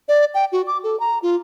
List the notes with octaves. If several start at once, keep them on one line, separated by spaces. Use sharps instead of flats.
D5
G5
F#4
D6
A4
A#5
F4